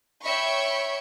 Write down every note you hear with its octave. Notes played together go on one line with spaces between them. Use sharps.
C#5 E5 G5 B5 C#6